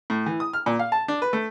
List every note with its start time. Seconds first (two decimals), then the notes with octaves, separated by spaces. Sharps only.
0.10 A2
0.26 E3
0.40 D#6
0.53 F6
0.66 A#2
0.79 F5
0.92 A5
1.08 D4
1.22 B4
1.33 A3